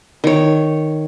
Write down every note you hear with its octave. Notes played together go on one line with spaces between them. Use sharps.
D#3 C#5